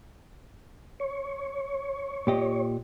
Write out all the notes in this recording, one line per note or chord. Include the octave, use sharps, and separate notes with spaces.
C#5
A#2 G4 D#5